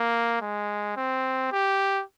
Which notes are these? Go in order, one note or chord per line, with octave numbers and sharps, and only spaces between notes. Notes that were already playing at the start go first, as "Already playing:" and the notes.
Already playing: A#3
G#3
C4
G4